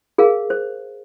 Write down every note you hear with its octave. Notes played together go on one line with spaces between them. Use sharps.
G#4 A#4 F5
C5